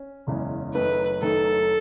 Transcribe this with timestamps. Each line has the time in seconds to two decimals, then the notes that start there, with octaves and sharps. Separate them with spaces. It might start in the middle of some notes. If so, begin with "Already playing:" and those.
Already playing: C#4
0.27 F#1 E2 C#3 G#3 C#4
0.74 F#1 F#2 D#3 A3 D#4 B4
1.22 F#1 F#2 D#3 A3 D#4 A4